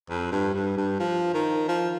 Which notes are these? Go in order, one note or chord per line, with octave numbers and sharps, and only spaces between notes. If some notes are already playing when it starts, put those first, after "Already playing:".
F2
G2
G2
G2
F3
D#3
F3